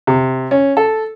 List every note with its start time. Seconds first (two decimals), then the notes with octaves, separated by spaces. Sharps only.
0.07 C3
0.51 C#4
0.77 A4